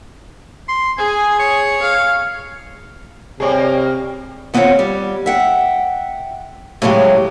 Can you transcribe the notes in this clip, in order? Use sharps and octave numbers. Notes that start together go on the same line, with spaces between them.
C6
G#4 G#5
C#5
F5
C3 F#3 G3 A#3 G#4 C#5
D#3 B3 C4 F4 C#5 F#5
G3
E5 F#5 G5
A2 C#3 F3 F#3 G#3 G4